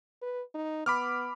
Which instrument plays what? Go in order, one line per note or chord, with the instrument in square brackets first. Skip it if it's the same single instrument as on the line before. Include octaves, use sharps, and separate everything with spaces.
[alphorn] B4
D#4
[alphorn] B3 [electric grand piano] B5 D6 F6